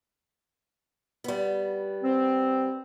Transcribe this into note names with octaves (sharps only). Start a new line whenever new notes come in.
G3 B3
C4